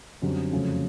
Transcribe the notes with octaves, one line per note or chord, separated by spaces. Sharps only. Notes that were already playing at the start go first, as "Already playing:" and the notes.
F#2 D3 G3 C4
F2 C#3 F#3 A3